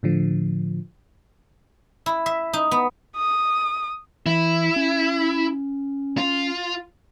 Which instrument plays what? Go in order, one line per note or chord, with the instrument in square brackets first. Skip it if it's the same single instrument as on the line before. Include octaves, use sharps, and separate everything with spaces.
[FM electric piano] A2 D3 F3
[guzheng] E4
E5
D#4
B3
[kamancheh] D#6
[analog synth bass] E3 [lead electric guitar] E4
[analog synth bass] C#4
[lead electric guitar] F4